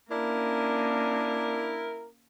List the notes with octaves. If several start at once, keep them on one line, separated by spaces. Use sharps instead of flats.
A#3 C#4 D4 E4 A#4